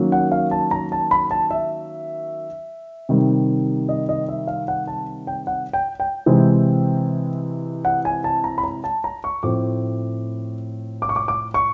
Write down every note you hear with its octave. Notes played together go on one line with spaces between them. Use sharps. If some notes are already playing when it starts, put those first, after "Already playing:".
Already playing: D#3 F#3 A#3 C#4
F#5
F5
A5
A#5
A5
B5
A5
E5
C3 D#3 G3
D#5
D#5
E5
F5
F#5
A5
G5
F#5
G5
G5
C3 E3 G#3 C4
F#5
G#5
A5
A#5
B5
A#5
A5
A#5
C#6
A2 F3 A3 C4 D6
D6
C#6
D6
D6
C#6